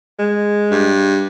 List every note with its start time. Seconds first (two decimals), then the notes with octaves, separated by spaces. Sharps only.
0.19 G#3
0.71 G2